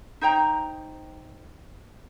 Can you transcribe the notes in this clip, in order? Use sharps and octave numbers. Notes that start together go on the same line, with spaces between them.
D#4 C5 G5 A#5